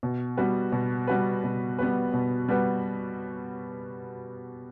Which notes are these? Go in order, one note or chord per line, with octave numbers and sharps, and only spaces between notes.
B2
G3 B3 F#4 B4
B2
G3 B3 F#4 B4
B2
G3 B3 F#4 B4
B2
G3 B3 F#4 B4